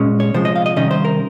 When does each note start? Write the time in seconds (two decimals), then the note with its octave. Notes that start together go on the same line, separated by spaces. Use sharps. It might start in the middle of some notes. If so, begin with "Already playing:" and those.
Already playing: A#2 G#3 C#4
0.20 C#5
0.34 C3 F3 G#3 C5
0.45 D#5
0.56 F5
0.66 D#5
0.76 C3 D#3 G3 C#4 D#5
0.91 C5
1.05 A#4